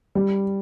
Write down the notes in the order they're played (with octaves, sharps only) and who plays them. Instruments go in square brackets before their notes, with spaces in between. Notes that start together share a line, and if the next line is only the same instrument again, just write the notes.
[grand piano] G3